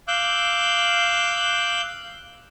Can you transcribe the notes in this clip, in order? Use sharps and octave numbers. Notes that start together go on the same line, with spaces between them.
F5 D6 E6 F#6 G6